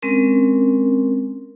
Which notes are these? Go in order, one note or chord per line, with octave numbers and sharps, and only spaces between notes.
G#3 C4 C#4 A#4